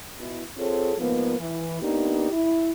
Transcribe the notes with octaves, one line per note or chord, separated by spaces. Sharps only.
B2 E4
C4 F4 G#4 A4 C#5
G#2 F3 A#3 B3
E3
A#3 B3 D4 D#4 G4
E4